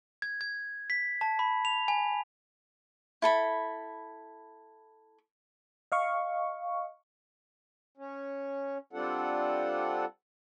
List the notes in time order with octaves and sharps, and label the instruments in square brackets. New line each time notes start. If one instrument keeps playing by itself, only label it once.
[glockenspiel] G#6
G#6
B6
A5
B5
F7
G#5
[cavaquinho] E4 A4 B5
[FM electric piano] D#5 F5 C#6
[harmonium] C#4
G3 C4 D4 F4 A4 F#5